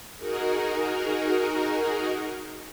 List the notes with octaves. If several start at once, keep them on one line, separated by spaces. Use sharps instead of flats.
D#4 F#4 G#4 A#4